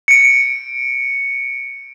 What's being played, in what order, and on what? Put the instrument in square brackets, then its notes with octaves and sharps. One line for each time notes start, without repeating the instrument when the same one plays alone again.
[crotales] C#7 D7